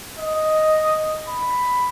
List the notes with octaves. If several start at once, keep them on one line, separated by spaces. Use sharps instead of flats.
D#5
B5